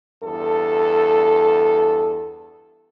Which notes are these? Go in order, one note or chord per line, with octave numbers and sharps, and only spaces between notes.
E2 G2 A4